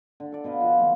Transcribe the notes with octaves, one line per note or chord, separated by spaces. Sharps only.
D3
A4 D5
B2 B4 D#5 F5
F3 F4 F#5
D#3 E3 F#3 A#3